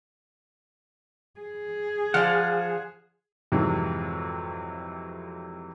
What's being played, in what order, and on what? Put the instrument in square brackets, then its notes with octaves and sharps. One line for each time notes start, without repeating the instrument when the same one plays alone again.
[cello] G#4
[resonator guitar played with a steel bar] F3 D5 [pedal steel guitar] C5 F5 F#5
[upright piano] F2 G#2 C3 E3 F#3